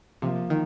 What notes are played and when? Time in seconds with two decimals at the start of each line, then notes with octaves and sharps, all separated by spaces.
0.22 C3 F3 A#3 F4
0.50 D#3